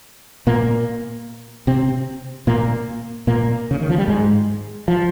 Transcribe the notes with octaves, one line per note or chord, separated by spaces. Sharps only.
A#2 A#3
C3 C4
A#2 A#3
A#2 A#3
C#3
D#3
F3
G3
G#2 G#3
F3